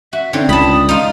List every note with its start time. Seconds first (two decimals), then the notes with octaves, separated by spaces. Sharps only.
0.13 F#4 E5
0.33 D3 C4 D#4 C#5
0.49 C#2 A5 B5 D#6
0.89 D#4 F4